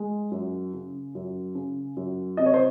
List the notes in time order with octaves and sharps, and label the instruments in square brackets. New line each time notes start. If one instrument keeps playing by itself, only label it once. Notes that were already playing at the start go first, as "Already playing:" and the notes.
Already playing: [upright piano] G#3
F#2
C#3
F#2
C#3
F#2
C3 D#5
C#5
C5